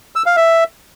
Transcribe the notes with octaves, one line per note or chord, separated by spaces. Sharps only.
E6
F5
E5